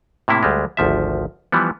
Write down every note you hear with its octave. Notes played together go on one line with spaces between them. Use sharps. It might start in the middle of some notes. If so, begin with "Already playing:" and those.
A2 C3 A#3 E4
D2 G3 G#3
G#1 D2 F3 E5
E3 F3 G3 B3